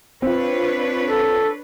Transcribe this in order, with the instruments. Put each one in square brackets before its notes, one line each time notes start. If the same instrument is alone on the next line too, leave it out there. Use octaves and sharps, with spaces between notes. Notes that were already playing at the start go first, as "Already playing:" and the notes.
[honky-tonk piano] C4 F4 [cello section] D4 B4 C#5
[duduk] A4